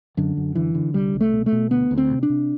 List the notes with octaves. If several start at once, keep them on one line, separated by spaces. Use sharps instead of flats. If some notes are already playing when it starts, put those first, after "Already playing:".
F#2 D3
F#2
D3 E3
D3
C2 G3
C2
A3
B2
A3
B2
D2 B3
D2
C4
C3
D4
C3